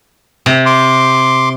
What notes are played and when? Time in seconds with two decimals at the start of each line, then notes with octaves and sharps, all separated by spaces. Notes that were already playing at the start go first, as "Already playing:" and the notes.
0.46 C3
0.66 C6 D6